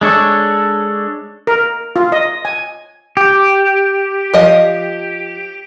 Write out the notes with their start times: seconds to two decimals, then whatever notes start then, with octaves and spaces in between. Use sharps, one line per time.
0.01 G#3 D4 A4 C#5
1.47 A#4
1.96 F4
2.12 D#5
2.45 G#5
3.17 G4
4.34 F3 D#5